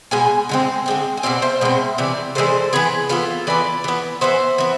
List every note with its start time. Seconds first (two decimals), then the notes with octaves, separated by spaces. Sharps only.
0.11 B2 G#3 G#5
0.49 D3 G#3 C4
0.86 D3 G#3 C4
1.17 G#5
1.23 B2 G#3 C4 D5 F5
1.42 C5 E5
1.61 B2 G#3 C4
1.98 C3 E3 D5
2.35 C3 E3 G#3 A4 C5
2.73 E3 B3 G#4 B4
3.09 E3 B3 F4 A4
3.47 E3 B3 B4 D5
3.84 E3 B3
4.21 E3 B3 C5 E5
4.58 E3 B3